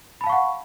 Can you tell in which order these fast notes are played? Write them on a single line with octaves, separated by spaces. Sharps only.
B5 A5 F5 C#6 F#5